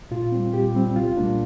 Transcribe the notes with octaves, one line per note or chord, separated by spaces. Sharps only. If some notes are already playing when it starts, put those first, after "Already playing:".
A#2 F4
G3 C4
A#2 G4
G3 C4
C2 F4
A#2 G3 A#3 D4